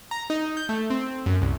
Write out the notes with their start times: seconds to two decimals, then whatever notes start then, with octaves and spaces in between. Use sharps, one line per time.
0.11 A#5
0.30 D#4
0.57 G6
0.69 A3
0.90 C4
1.26 F#2
1.42 C2